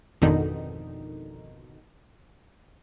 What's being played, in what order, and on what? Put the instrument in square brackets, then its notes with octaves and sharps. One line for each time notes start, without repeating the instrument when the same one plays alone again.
[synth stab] G#1 F2 B2 D3 D#3 D#4